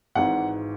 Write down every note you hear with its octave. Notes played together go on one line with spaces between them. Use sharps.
G#1 G#2 E3 F#5